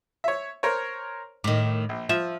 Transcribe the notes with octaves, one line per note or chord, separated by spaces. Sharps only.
C#5 E5
A#4 C5 C#5
A2 D#3 D6
A#1
F3 E5